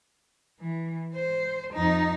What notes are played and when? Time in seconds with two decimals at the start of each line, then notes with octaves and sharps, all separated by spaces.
0.61 E3
1.14 C5
1.74 F2 D#4